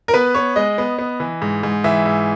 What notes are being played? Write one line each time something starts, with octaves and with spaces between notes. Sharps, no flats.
A#4
B3 B4
B3 C#5
G#3 D#5
B3
B3
E3
G#2
G#2
E3 E5
G#2